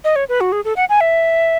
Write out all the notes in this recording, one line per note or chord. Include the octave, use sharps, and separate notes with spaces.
D#5
C#5
B4
F#4
G#4
A4
F#5
G#5
E5